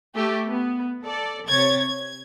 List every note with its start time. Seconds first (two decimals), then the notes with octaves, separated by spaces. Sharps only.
0.15 A3 G4
0.46 B3
1.02 A4 D5
1.48 C3 C#5 G#6 A6
1.80 G#6